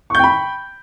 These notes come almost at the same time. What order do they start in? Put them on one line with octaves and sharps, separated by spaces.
C#6 G6 G5 B5